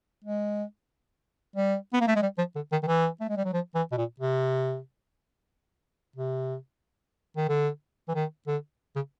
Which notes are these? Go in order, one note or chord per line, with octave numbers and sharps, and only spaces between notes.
G#3
G3
B3
A#3
A3
G#3
G3
F3
D3
D#3
D#3
E3
A3
G#3
G3
F#3
F3
E3
B2
A#2
C3
C3
D#3
D3
E3
D#3
D3
C#3